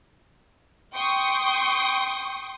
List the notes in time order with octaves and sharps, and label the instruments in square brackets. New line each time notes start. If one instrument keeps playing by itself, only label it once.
[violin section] G5 C6 C#6 D#6